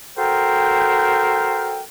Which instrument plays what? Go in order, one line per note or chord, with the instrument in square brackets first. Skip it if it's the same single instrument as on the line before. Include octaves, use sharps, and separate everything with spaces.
[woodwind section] F#4 A4 A#4 C5 G5